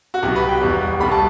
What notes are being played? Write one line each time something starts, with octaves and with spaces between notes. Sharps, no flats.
F#4
C2 B2 F#3 G4
B4
G5
E1 E2 B2 G3
C2 B2 G3 B5
A5